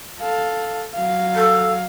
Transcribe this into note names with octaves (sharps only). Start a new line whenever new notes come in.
A4 F5
F#3 F5
A4